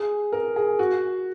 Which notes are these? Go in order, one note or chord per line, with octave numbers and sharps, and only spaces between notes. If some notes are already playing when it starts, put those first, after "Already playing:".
Already playing: G#4
A#4
G#4
F#4